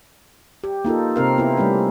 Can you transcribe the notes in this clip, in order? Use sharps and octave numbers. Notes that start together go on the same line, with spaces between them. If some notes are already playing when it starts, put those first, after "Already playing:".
G4
A#3 D#4 F4 A4
C3 C4 A#4 F5
B3 E4
G3 A3 C#4 G4